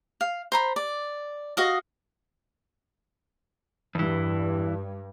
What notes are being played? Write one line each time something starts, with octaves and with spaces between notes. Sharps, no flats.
F5
C5 A#5 B5
D5
F#4 D#5 F5
E2 G2 E3